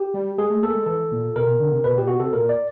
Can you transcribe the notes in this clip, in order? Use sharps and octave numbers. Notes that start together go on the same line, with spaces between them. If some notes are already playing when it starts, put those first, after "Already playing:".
Already playing: G4
G3
G#3 G#4
A3
A#3 A4
G#3
E3 A4
A#2
B2 A#4
B2
D3
C3
B2 B4
A#2 G4
B2 F#4
C3 A4
A#2 A#4
D5